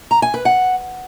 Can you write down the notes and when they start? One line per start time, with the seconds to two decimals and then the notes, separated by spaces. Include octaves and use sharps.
0.11 A#5
0.22 G#5
0.34 B4
0.45 F#5